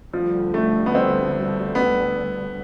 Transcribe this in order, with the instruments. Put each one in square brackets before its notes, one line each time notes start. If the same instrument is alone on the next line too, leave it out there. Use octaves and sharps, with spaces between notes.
[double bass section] D2 D3 G3 [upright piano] F3
[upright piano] A3
B3
C4
B3